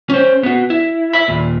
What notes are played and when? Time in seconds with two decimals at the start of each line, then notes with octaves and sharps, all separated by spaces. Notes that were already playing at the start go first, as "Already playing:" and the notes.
0.10 C#4 C5
0.43 B3 F#4
0.70 E4
1.13 E5 B5
1.28 D#2 A#2